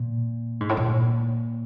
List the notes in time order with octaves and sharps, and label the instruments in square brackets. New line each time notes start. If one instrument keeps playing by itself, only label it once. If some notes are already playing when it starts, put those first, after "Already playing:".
Already playing: [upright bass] A#2
G#2
A2
A#2